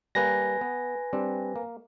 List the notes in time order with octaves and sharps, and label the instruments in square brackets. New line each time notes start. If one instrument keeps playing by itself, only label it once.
[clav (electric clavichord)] G3 A#3 [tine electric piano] B4 G#5 A#6
[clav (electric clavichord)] B3
G3 C4 D4
A#3